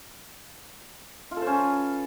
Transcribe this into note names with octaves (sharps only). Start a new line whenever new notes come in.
F4
A4
C5
C#4
B4